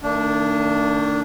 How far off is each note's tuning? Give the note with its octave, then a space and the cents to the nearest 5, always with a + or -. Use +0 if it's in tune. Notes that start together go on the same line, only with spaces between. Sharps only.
D#3 +0 A3 +40 D4 -10